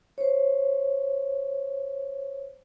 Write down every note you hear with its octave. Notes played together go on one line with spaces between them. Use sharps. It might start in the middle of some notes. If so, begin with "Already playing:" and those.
C5 C#5